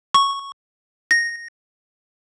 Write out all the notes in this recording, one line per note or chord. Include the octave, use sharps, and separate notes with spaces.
C#6
A#6